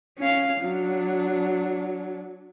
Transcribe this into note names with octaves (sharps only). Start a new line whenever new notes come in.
C#4 F5
F#3 D4